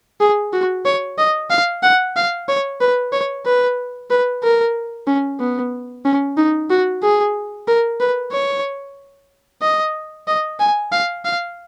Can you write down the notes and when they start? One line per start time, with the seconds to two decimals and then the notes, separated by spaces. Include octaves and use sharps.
0.20 G#4
0.53 F#4
0.85 C#5
1.18 D#5
1.50 F5
1.83 F#5
2.16 F5
2.48 C#5
2.81 B4
3.12 C#5
3.46 B4
4.10 B4
4.43 A#4
5.07 C#4
5.40 B3
6.05 C#4
6.37 D#4
6.70 F#4
7.03 G#4
7.67 A#4
8.00 B4
8.32 C#5
9.62 D#5
10.27 D#5
10.60 G#5
10.92 F5
11.25 F5